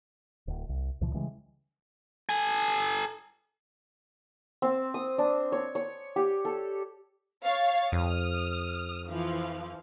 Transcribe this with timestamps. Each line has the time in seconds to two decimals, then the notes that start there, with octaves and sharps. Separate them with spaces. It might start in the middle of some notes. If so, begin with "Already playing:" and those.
0.48 D1
0.69 C2
1.01 C#2 A#2 E3 F3
1.14 C#3 E3 G3 G#3
2.29 A4 G#5
4.62 C4
4.94 D#6
5.18 D4
5.52 C#5
5.75 C#5
6.16 G4
6.45 A4
7.45 C#5 F5 A6
7.92 F2 D#6 F6
9.10 E3 F3 F5